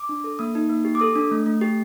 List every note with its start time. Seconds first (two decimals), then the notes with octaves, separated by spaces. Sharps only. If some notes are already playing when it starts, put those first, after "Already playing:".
Already playing: D6
0.09 D4
0.24 A4
0.39 A#3 D#6
0.55 D#4
0.70 A#3
0.85 G4
0.95 D6
1.00 A4 D#6
1.16 D4
1.31 A3
1.46 A3
1.61 G4